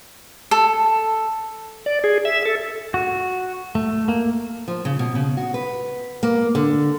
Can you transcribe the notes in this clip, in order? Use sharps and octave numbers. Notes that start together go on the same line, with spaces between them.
A4
D5
G#4
E5
A4
F#4
A3
A#3
F3
C#3
B2
C#3
F#4
B4
A#3
D3